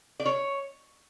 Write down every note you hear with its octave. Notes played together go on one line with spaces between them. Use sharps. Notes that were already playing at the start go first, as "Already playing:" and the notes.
D5
C#5